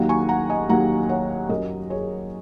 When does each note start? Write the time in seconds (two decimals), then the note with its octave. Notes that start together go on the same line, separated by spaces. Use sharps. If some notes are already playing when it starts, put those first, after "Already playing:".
Already playing: D#2 D#3 F#3 A#3 F#5 A#5
0.09 G#5 C#6
0.29 F#5 A#5
0.50 D#5 G#5
0.69 D#2 D#3 F#3 A#3 F#5 A#5
1.09 C#5 F#5
1.49 F#2 F#3 C#4 A#4 D#5
1.90 G#4 C#5